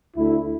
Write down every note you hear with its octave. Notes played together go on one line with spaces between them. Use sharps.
D2 D3 A3 E4